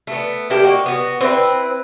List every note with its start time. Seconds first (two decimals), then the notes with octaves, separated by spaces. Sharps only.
0.07 A3 B3
0.50 A#3 E4 G4 A4
0.64 A#3 D#4 F#4
0.86 B3 F#4
1.21 C4 E4 B4